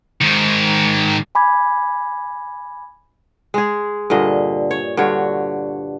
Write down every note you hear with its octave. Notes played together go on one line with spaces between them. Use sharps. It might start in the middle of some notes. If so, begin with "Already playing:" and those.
G#2 D#3
G#5 B5 D6 G#6
G#3 G#4
G2 A#2 D3 D#5
C#5
G2 D3 F#4 C#5